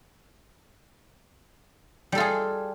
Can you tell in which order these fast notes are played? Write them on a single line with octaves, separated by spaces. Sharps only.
G3 A4 F4 G#4